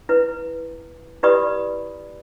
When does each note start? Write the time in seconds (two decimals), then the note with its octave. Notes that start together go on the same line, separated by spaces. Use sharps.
0.09 E4 B4
1.23 E4 G4 B4 D5 B5 D#6